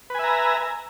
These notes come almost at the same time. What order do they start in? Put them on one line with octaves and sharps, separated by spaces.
B4 G#5 E5 A#5